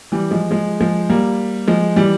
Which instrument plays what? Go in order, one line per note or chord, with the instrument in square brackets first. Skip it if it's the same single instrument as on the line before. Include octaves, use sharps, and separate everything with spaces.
[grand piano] E3 G3
F3 G#3
F3 G#3
F3 G#3
G3 A#3
F3 G#3
E3 G3